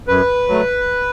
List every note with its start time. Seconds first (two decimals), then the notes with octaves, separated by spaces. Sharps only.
0.07 F#2 B4
0.48 F#3 A3